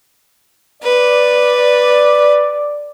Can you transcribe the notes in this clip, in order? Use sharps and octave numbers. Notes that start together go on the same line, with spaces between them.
B4 D5